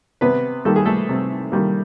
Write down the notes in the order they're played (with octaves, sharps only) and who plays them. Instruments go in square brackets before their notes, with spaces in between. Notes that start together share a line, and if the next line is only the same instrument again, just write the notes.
[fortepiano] C3 B3 B4
D#3 G3 A#3 A4
G#4
A3 A4
C3
D#3 G3 A#3